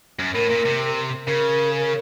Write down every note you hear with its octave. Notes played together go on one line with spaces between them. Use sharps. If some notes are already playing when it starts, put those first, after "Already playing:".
F#2
A2 A#4
A#2
C3
C#3 A#4